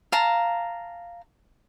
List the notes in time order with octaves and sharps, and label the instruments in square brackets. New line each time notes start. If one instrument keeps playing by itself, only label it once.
[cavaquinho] F5 A5 A#5